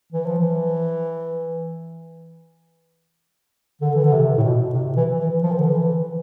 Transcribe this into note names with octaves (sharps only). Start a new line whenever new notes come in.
E3
F3
E3
D3
E3
D3
C3
A2
B2
C3
E3
E3
F3
E3
D3
E3